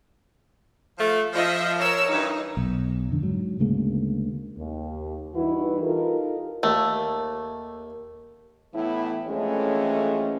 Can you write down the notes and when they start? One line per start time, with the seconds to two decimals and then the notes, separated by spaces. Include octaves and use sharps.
0.97 F3 A3
1.33 F3 D#5 E5
1.79 A#4 C#5 E6
2.09 G2 E3 D#4
2.57 B1
3.09 F2 D3
3.22 G#2 F#3
3.60 D2 C#3 G#3 A#3
4.57 D#2
5.34 G2 E3 D#4 E4 F#4 B4
5.82 D#4 F4 G4 A4 A#4
6.63 D#2 A3
8.74 A2 E3 B3 E4
9.28 F2 E3 G#3 A3 C#4